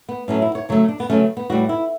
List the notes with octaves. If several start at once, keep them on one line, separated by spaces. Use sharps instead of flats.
B3
A2 F#3 A3 C#4
E4
C#5
C#3 F#3 A3 C#5
D4
B3
C#3 F#3 A3 C#4
B3
A2 G3 F#4
E4